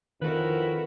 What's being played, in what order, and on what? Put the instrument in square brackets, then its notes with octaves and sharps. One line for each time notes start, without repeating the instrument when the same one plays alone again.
[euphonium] F2 [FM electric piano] D#3 [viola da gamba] E4 F#4 A#4 [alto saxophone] B4